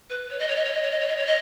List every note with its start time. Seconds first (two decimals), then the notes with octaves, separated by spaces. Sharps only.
0.10 B4
0.30 C#5
0.39 D#5
0.48 C#5
0.56 D#5
0.65 C#5
0.74 D#5
0.82 C#5
0.91 D#5
1.00 C#5
1.08 D#5
1.17 C#5
1.26 D#5